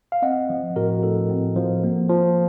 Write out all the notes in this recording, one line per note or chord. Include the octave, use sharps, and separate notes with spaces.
F5
C4 D#5 F#5
F3
A2 F#4 A#4
A2 A4
C4
F3
A#3
F3